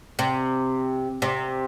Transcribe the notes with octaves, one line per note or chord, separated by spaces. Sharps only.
C3
C3